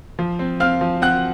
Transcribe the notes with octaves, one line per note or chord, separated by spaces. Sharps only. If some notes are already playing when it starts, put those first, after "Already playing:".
F3
C4
C4 F5 F6
F3
C4 F#5 F#6